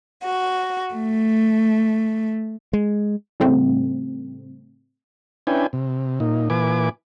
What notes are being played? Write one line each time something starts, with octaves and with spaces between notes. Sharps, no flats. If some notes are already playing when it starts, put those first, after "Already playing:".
F#4
A3
G#3
A2 C#3 G3 A3 C4
C#4 D4 E4 B4 G5 G#5
C3
A#2 D#4
A#2 E3 B4 G#5 D6